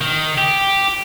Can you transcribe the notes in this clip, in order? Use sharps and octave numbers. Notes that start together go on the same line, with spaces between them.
D#3
G4